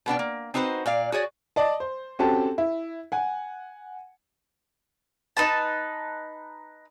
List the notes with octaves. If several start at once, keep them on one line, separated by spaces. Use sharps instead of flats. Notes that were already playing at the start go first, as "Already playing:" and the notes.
B2 B3 D4 G5
A#3
C4 D#4 F#4 B4 C5
A#2 D5 F5
F#4 G#4 C#5 D5
D5 D#5 A5
C5
C4 C#4 F#4 G4 A4 A5
E4
F#5 G#5
D#4 B4 A5